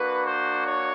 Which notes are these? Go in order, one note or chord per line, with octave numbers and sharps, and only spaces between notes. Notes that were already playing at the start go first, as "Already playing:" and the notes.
Already playing: A#3 D4 F#4 B4
C5
C#5